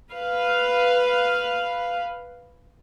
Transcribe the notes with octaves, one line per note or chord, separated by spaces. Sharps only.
B4 F5